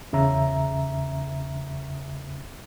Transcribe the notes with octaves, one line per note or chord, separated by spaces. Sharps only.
E2 C#3 E5 A#5